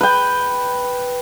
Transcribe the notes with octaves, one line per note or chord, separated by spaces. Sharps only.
B4 G5